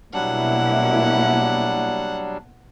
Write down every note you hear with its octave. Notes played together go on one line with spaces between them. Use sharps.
B2 F#3 G3 A#3 D4 E4 F#5